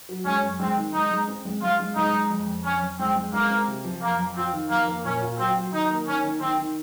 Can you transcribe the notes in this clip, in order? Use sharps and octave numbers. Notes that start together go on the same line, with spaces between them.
F#3
G#3 C#4
F#2
G#3 C4
D#3
G#3 D#4
G#3
C4
G#3
G#3 F4
G#3
G#3 D#4
G#3
F2
F2
F2 C#4
F2
G#3 C4
G#3
G#3 A#3
C4
C3
F3
F2 A#3
F2
C4 F4
D#3
F2 A#3
A#3
A#2 C#4
F4
F#3 C4
F#3
D#3 D#4
A#3
D#3 C#4
D#3
D#3 C4
D#3